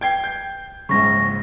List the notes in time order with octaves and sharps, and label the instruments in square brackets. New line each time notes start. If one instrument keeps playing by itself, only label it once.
[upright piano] G5 G#6 C7
G6
[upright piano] A#1 G#2 C#3 [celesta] C#6 A#6